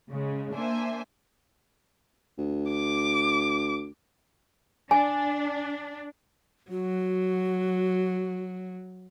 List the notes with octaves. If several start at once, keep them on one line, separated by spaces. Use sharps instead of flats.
C#3 G#3
A#3 D4 C5 E5 G#5
D2
D6
D4 G#5
F#3 F#4